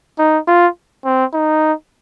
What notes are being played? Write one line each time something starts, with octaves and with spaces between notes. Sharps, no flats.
D#4
F4
C4
D#4